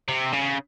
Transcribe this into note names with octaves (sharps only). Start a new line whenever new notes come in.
C3
C#3